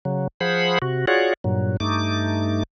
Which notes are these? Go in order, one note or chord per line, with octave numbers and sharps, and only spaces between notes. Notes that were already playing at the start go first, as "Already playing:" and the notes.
C#3 F#3
F3 G#4 C5 F#5 B5
C3 F#4
F4 F#4 G#4 C#5 D5 F#5
G2 A#2 F#3
G2 A3 D#4 D6